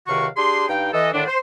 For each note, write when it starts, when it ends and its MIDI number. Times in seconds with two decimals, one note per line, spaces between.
0.07 0.27 37
0.07 0.27 48
0.07 0.27 51
0.07 0.27 66
0.07 0.27 77
0.07 0.27 85
0.36 0.67 62
0.36 0.67 67
0.36 0.67 68
0.36 0.67 84
0.68 0.92 43
0.68 0.92 63
0.68 0.92 77
0.68 0.92 79
0.93 1.12 52
0.93 1.12 69
0.93 1.12 75
1.13 1.24 45
1.13 1.24 50
1.13 1.24 51
1.13 1.24 62
1.27 1.38 72